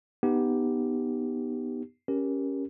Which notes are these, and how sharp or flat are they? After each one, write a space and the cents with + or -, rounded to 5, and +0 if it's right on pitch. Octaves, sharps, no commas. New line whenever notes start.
B3 -5 D#4 -10 G4 +0
C#4 +0 G4 +0 A#4 +10